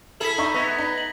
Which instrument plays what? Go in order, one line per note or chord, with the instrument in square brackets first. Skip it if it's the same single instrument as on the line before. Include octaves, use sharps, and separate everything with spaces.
[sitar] E4 G#4 A4 [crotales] B6 F#7
[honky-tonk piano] D#4 E5 C#6 [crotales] B6
[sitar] B3 [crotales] G#6 A#6 B6
[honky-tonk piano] D#4
[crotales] F#7